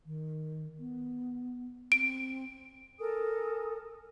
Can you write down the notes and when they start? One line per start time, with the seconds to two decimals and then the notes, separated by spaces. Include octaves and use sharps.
0.06 D#3
0.79 B3
1.92 C4 D7
2.99 A4 A#4 G#5 D#6